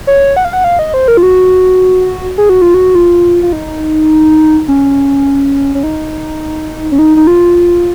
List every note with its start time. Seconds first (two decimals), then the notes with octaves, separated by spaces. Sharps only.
0.07 C#5
0.37 F#5
0.45 F5
0.53 F#5
0.64 F5
0.79 D#5
0.94 C5
1.08 A#4
1.17 F4
1.23 F#4
2.38 G#4
2.49 F#4
2.62 F4
2.74 F#4
2.95 F4
3.43 F4
3.53 D#4
4.68 C#4
5.75 C#4
5.83 D#4
6.92 C#4
6.99 D#4
7.17 D#4
7.27 F4